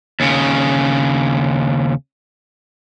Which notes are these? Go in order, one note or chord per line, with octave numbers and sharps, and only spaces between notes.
D#2 C#3